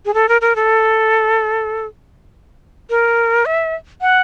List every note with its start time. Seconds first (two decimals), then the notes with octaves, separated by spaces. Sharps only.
0.06 G#4
0.14 A4
0.29 A#4
0.41 A#4
0.56 A4
2.90 A#4
3.46 E5
4.01 F#5